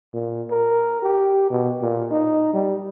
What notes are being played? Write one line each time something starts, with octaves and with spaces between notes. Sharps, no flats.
A#2
A#4
G4
B2
A#2
D#4
G3